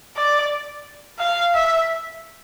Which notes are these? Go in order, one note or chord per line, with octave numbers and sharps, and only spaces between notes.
D5
F5
E5